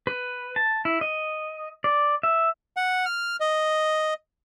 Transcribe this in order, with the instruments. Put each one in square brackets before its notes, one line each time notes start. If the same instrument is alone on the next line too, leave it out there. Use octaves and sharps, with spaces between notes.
[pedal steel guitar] B4
A5
E4
D#5
D5
E5
[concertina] F#5
F6
D#5